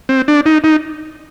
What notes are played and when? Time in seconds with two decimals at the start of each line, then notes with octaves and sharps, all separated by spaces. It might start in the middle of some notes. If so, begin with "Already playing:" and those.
0.09 C4
0.28 D4
0.46 D#4
0.64 D#4